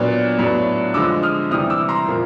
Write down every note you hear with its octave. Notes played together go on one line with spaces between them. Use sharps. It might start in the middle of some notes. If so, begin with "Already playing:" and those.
Already playing: A#2 F#3 B3 D4
A2 F#3 B3 D4
D3 F3 G#3 D6 E6
D#6 F6
C3 E3 G3 D#6 F6
D6 E6
A#5 C6
A#2 F3 A#3